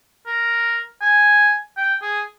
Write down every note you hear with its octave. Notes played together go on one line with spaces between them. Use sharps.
A#4
G#5
G5
G#4